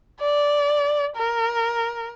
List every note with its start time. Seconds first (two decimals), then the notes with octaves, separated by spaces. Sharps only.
0.20 D5
1.16 A#4